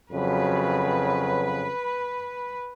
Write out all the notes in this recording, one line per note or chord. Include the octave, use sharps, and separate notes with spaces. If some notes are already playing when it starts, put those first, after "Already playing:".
F2 C#3 F#3 B4